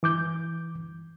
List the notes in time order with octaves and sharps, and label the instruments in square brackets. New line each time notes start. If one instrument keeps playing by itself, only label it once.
[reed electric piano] E3 D6 G6